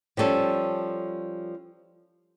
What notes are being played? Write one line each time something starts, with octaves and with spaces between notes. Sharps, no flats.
F3 G3 C#4 A4